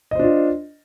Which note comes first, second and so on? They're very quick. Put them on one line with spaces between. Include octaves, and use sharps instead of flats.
D#5 C5 D4 F4